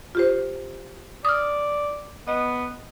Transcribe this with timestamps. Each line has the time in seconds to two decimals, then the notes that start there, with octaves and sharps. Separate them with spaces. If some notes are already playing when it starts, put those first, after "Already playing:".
0.15 F4 G4 C5
1.25 D5 D#6 F6
2.28 B3 D#5